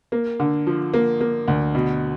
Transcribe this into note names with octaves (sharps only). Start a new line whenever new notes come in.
A#3
D3
F3
A#3
A#3
D2
B2